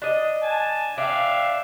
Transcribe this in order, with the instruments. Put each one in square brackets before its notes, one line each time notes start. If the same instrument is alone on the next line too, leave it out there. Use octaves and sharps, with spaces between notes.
[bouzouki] D4 D#5
[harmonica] G#5 A5
[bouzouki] D4 [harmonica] E5 F5 G5